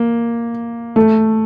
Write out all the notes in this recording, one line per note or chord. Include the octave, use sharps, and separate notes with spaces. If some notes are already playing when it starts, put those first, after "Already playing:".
Already playing: A#3
A3